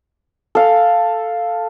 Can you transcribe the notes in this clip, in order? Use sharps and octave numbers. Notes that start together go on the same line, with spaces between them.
A4 F5